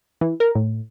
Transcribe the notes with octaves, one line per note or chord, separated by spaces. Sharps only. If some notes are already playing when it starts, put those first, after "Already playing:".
E3
A#4
A2